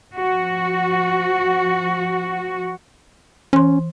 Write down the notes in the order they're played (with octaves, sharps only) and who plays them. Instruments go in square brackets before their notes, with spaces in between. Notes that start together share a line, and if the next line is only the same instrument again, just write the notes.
[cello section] F3 F#4
[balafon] E3 C6 [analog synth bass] C#4